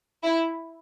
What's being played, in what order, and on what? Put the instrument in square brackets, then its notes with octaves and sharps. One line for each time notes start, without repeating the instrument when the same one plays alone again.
[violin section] E4